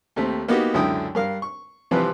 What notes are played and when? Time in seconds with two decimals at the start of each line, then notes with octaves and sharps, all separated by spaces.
0.16 D#2 A3 C4
0.48 A#3 B3 D#4 F#4 G4
0.74 C#2 F#2 D3 E4 G5 D#6
1.15 G2 A#4 F5
1.42 C#6
1.91 C3 E3 F3 G3 C4 B4